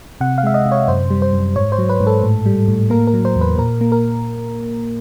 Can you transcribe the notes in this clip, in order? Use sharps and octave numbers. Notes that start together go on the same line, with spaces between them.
C3 F#5
F5
G#3 E5
D#5
C3
C#5
F#2 C5
G3
C5
F#2
G#2 C#5
C5
F#3
B4
G#2
A4
A2
G3
A2
A#3 A#4
A#4
F#3
C5
E2
B4
A#2 A#4
A#3
A#4